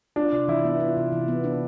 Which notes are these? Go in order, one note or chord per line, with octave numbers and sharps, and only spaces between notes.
D4 F4
C3
E3 E4
B3
F4
C3
E3
B3
D4